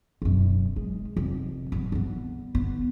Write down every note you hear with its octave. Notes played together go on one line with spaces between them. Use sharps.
E1 F#2
G#3
F1 A#1
G2 F#3
G2 B3
D3 B3